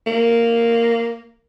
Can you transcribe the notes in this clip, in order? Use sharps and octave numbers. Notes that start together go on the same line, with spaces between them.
A#3